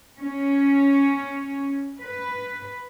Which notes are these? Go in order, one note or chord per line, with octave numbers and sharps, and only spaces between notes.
C#4
B4